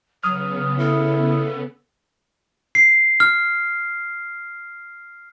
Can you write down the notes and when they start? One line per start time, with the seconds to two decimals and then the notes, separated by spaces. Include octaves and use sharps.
0.23 C#3 F#3 B3 D#6 F6
0.79 E4 A4
2.75 C7
3.20 F6